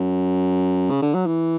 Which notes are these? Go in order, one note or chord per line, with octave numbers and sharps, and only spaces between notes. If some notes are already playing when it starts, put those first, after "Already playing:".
Already playing: F#2
C#3
D3
F#3
E3